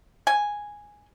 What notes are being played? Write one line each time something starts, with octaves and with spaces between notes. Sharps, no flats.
G#5